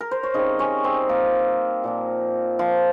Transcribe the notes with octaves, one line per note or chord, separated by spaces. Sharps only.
A#4
C5
C#5
C#3 G3 C4 D#4 D#5
C#4 C#5
C4 C5
A#3 A#4
A#2 F3 A#3
F3 F4